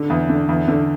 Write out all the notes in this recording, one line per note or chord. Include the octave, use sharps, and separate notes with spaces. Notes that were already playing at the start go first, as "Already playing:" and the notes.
Already playing: D3
E2
D3
E2
D3